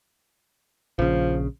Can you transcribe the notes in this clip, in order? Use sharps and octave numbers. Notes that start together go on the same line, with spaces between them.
A#1 C#3 F3